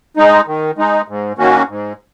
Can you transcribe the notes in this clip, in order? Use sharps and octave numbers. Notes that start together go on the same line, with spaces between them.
G#3 D#4
D#3
G#3 D#4
G#2
D#3 A#3 C#4 F#4
G#2